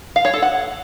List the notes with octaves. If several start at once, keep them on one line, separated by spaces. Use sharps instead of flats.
F5
C#5
A4
F#5